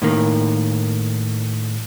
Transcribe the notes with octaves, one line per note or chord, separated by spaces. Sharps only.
A2 D#3 A#3